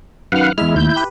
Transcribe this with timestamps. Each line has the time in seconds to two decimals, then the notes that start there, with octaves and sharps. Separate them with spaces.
0.32 F#2 D#3 B4 F5 F#5 F6
0.58 E2 G#3 E4 E5 F6
0.76 D#2 A2 E4 G6
0.96 G4 B4